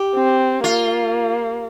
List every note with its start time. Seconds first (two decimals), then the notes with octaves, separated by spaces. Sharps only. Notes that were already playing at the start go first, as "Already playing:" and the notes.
Already playing: G4
0.15 C4
0.64 A#3 F4